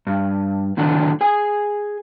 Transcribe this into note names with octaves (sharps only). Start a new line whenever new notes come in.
G2
A2 D3 D#3 F#3 D4
G#4 G#5